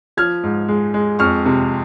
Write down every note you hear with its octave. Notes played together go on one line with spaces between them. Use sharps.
F3 F6 G#6
G#2
G#3
G#3
F2 C#6 F6
C3